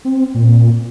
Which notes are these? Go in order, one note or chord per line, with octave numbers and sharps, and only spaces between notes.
C4
A#2